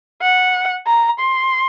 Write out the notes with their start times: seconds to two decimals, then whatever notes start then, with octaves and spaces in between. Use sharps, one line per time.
0.22 F#5
0.87 A#5
1.19 C6